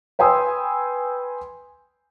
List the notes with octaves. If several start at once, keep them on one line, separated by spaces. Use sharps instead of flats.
B4 G5 G#5 C6 D#6 E6